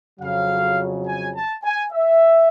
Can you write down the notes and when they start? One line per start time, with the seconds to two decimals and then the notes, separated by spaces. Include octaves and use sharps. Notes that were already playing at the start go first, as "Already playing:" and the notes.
0.20 F2 C#3 F#3 F5
1.07 G#5
1.35 A5
1.64 G#5
1.93 E5